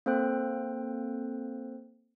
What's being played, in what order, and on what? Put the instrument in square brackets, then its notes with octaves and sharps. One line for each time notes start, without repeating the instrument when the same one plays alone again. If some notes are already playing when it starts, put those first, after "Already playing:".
[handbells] A#3 C4 A4 C5 G5 F#6